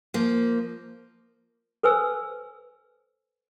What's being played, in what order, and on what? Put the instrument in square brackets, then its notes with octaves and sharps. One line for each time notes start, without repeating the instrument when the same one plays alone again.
[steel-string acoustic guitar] F3 A#3
[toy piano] A4 B4 C5 G#5 E6